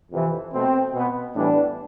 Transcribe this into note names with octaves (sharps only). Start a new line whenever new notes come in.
F2 C3 E3
B2 A3 C4
B2 B3
A2 E3 G3 B3 D4